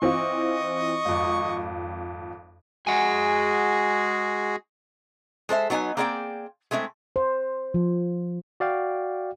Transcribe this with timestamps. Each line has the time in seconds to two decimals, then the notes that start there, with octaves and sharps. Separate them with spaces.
0.02 E3 C4 F4 D#5 C#6
1.05 G#1 F2
2.87 G#3 F#4 G#4 F#5 G#5
5.49 G#3 A4 C5 E5
5.70 F#3 B3 D#4 F4 G#5
5.97 A#3 C4 G#4 D5 F#5 G5
6.71 G#3 A3 C4 D#4 E4
7.16 C5
7.74 F3
8.60 F#4 D5 F5 G5